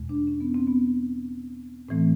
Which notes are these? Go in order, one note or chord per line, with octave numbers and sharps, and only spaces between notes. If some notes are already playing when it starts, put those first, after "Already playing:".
Already playing: E2 B2 G#3
D4
C#4
B3
C4
B3
A2 E3 A3 C4